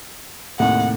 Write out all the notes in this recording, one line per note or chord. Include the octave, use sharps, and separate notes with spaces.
D#2 A2 C3 F#5